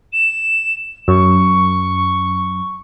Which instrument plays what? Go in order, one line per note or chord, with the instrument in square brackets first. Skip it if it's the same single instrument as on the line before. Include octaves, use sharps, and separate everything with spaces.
[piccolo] E7
[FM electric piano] F#2 [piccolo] C#6